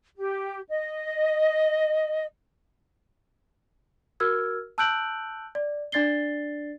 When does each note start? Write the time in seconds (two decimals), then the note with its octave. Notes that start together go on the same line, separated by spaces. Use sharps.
0.17 G4
0.69 D#5
4.20 F#4 A#4 E6 F6 G#6
4.78 A5 E6 F#6 G6 D7 F#7
5.55 D5
5.92 D4 D5 A6 C7 G7